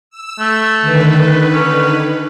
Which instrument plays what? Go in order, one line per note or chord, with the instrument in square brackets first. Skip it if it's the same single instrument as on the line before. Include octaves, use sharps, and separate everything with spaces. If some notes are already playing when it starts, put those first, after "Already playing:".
[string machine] E6
[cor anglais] A3
[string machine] D3 D#3 B4
[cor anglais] C#4